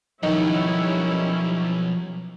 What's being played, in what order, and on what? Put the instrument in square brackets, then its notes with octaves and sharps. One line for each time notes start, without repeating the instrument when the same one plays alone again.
[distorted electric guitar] B1 [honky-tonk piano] D#3 D#4 [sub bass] F3 [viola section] G3 C#4 E4